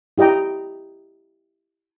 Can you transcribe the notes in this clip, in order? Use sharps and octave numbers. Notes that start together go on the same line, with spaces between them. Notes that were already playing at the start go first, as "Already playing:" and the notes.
E4 G4 D#5 G5 A#5